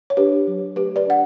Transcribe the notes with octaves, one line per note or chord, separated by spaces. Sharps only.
C#5
D4 G4 B4
F#3
A3 G4 B4
B4 D5
D4 F#5